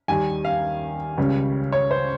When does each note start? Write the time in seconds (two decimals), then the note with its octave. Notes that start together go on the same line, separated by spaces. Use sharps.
0.08 D#2 D#3 G3 G#5
0.45 F5
1.17 C#2 C#3 G3
1.72 C#5
1.91 C5